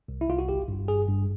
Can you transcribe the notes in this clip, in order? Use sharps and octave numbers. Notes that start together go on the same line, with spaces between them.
C2
E4
C2 F4
F#4
G1 G4
G2
G1 G#4
G2